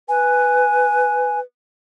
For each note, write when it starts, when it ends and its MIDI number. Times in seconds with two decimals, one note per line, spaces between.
0.09 1.39 71
0.09 1.40 80